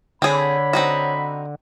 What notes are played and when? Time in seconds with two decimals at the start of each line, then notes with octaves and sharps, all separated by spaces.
0.22 D3 C4 G#4 C#5 B5
0.73 C4 D#4 F#4